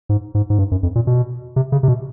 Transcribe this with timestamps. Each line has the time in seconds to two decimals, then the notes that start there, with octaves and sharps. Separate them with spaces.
0.09 G#2
0.35 G#2
0.50 G#2
0.59 G2
0.71 F#2
0.83 F2
0.95 A#2
1.07 B2
1.56 C3
1.72 C#3
1.83 C3
1.88 B2